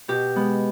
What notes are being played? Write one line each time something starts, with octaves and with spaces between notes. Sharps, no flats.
B2 G4
G#3 B3